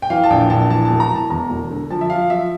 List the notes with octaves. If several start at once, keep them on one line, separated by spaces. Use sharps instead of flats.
G5
E3 F5
A5
A#1 G5
A#1 A5
E3 A5
E1 A5
A#5
E3
A5
E2 A#5
E1
D3
F3 A5
E5
F3 F5
F3 E5